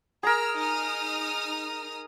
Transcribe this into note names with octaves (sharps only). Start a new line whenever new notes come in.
G#4 A#4 A#5 E6 F6
D#4 D#6 F6